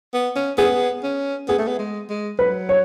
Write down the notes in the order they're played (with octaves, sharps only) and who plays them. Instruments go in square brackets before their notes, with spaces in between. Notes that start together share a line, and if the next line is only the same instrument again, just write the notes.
[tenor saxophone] B3
C#4
[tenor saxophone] B3 [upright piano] G#4
[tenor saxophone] C#4
[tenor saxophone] B3 [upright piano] G#4
[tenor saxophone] A3
B3
G#3
G#3
[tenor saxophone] F#3 [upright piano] B4
[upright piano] C#5